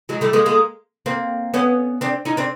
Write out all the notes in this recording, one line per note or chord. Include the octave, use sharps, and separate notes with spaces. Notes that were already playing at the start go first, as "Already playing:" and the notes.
F#3 G#3
G3 A3
G#3 A#3
G#3 A#3
A#3 C4
B3 C#4
C4 D4
C#4 D#4
C4 D4